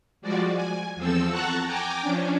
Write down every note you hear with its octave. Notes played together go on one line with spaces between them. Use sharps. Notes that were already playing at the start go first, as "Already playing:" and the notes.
F3 G3 G#3 F#4 D5
G#5
E2 F3 C4 A4 E6
F#5 A5 A#5 C#6 F#6
G5 G#5 A#5 D6
F3 C#4 D4